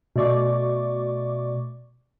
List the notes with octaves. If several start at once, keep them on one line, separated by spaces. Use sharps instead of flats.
B2 A3 D5 C#6 D6